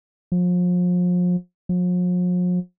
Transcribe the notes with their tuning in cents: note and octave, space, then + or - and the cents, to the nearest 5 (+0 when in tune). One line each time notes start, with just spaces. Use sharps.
F3 +35
F3 +45